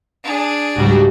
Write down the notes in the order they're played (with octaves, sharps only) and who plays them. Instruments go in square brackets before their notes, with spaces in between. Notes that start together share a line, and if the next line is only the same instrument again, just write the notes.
[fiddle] D4 G#4
[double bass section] C#2 G#2 G3 [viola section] F#4 G4